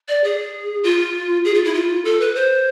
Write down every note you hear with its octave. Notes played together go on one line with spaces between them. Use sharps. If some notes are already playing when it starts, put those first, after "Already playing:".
D5
G#4
F4
G#4
F4
E4
F4
A4
B4
C5